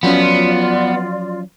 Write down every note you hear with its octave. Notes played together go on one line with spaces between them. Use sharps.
F3 F#3 B3 C#4 F4 D5